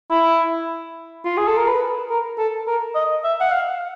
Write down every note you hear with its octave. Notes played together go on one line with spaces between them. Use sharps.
E4
F4
G#4
A4
A#4
B4
A#4
A4
A#4
D#5
E5
F#5
F5